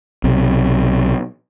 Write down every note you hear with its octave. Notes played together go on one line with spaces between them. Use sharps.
B1 C3